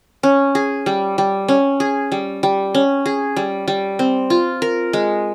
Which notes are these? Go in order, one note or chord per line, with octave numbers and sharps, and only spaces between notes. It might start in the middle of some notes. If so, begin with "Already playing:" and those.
C#4
G#4
G3
G3
C#4
G#4
G3
G3
C#4
G#4
G3
G3
C4
F4
A#4
G#3